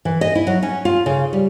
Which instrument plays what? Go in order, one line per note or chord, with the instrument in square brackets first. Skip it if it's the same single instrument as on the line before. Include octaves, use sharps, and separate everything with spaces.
[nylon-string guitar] E3
D#5
E4
F#3
C#4
F4
C#3
G3